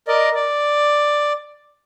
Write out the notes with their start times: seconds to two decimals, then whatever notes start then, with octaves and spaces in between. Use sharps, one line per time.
0.08 A#4 D5 D#5
0.35 D5